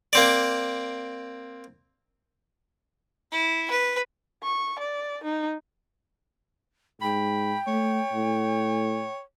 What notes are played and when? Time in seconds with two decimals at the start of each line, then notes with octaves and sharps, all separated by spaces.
0.13 A#3 C4 D5
3.32 E4
3.71 B4
4.43 C#6
4.79 D5
5.24 D#4
7.02 G#2 G5 B5
7.67 A3 C#5
8.13 A2